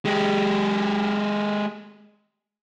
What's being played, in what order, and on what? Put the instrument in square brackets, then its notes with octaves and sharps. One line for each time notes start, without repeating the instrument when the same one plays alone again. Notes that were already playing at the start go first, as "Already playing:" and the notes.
[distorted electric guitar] G#3 G4